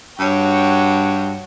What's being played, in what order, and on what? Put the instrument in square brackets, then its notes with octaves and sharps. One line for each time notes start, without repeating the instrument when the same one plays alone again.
[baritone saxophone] G2 [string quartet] F#4 C#5 G5